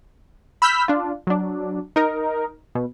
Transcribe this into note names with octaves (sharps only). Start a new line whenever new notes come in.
B5 E6 F6 G6 B6
D4 F4
F#3 D4
D#4 A#4
B2